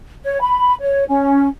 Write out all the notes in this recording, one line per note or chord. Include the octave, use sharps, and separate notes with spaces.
C#5
B5
C#5
C#4